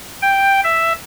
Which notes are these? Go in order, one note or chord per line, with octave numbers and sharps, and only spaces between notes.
G5
E5